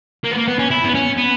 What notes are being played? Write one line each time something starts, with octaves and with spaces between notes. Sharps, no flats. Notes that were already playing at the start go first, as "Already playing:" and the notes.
A#3
B3
A#3
B3
C#4
E4
B3
C#4
B3